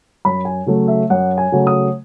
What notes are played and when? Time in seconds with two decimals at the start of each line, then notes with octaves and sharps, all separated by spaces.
0.25 F#2 B5
0.45 G#5
0.66 C#3 F#3 A3
0.88 E5
1.10 F#2 F#5
1.38 G#5
1.52 C#3 F#3 A3
1.67 D#6